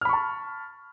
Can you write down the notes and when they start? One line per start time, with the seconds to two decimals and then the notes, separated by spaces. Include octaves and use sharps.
0.01 F6
0.05 B5
0.09 C#6
0.13 A5